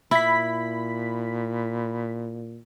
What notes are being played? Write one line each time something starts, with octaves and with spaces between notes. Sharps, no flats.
A#2 E4 B5 B6